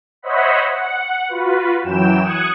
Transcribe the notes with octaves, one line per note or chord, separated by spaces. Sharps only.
C5 C#5 D#5 E5 F#5 B5
F#5
F4 F#4 B4
F#2 E3 F#3 G5 E7
D#6 F#6 G#6 C#7